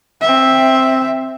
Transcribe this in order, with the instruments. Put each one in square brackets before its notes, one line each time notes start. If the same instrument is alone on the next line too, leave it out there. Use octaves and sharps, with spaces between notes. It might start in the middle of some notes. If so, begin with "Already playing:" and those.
[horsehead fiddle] C4 E5